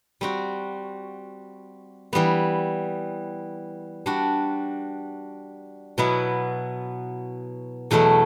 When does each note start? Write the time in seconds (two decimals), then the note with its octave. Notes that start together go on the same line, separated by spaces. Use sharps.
0.21 G3 C4 F#4
2.13 E3 G3 B3
4.06 G3 D4 F#4
5.98 B2 F#3 B3 E4
7.91 E2 B2 F#3 A3 E4